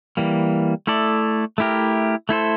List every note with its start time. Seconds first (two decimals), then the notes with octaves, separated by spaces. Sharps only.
0.17 E3 G3 A#3
0.87 A3 E4 A4 D5
1.58 A3 E4 G4 A#4
2.29 A3 E4 A4 C5